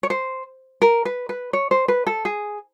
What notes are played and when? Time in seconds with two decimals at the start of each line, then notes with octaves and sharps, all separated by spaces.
0.03 C#5
0.10 C5
0.82 A#4
1.05 B4
1.29 B4
1.53 C#5
1.71 C5
1.88 B4
2.07 A4
2.25 G#4